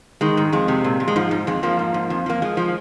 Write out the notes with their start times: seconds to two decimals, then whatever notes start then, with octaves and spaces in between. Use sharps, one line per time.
0.21 D#3 G#3
0.37 G#2
0.53 F2 G#3
0.68 C3
0.84 A#2
1.00 A#2
1.08 G#3
1.16 G#2 F3
1.31 G#2
1.47 F2 G#3
1.63 F2 F3 A#3
1.79 G#2
1.94 G#2
2.10 F2
2.26 F3 A#3
2.42 F3 G#3
2.57 F3